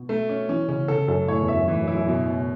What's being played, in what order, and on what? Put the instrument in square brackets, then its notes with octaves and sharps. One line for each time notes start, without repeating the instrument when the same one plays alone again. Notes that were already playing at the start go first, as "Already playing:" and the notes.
Already playing: [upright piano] B2
[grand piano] A3
C#4
[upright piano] E3 [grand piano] C#4
[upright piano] C#3 [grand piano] C#4
[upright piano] C#3 [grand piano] A4
[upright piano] F#2 [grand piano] A4
[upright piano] A2 [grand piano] C#5
[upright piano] E2
[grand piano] E5
[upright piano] F#2
[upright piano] A2 [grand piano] E3
[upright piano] F#2
[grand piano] E4
[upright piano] F#2
[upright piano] F#2 [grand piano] B2
[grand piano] B2